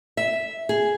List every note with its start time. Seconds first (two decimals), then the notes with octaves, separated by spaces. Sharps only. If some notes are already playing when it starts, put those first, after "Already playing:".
0.17 E5
0.69 G#4